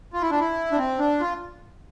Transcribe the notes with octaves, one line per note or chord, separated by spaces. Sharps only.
F4
E4
D4
E4
D4
C4
D4
F4